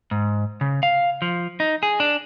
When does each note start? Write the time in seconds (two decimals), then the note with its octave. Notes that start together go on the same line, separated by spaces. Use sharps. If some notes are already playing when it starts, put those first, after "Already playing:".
0.11 G#2
0.61 C#3
0.83 F5
1.22 F3
1.60 D#4
1.83 G#4
2.00 D4